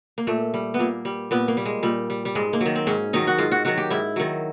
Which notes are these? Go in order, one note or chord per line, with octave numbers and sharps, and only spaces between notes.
A#3
A#2 A3
G3
B3
A#2 A#3
G3
A#2 B3
A#3
G3
G#3
A#2 G3
G3
G3
G#2 G#3
A#3
D#3 F#3
C4
G#2 C#4
D#3 F#3 D#4
F#4
G#2 F4
F#4
D#3 F#3 F#4
G4
G#2 E4
D#3 F#3